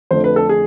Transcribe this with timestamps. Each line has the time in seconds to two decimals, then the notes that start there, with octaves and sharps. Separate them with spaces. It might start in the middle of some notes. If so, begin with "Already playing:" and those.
0.11 F2 D3 A3 C5
0.24 B4
0.36 A4
0.49 G#4